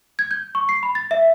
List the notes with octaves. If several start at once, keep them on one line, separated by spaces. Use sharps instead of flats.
G#6
G6
C#6
C7
B5
A6
E5